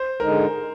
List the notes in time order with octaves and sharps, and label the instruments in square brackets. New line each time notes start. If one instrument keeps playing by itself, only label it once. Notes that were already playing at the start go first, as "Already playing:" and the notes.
Already playing: [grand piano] C5
[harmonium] D3 G#3 D#4 [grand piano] A#4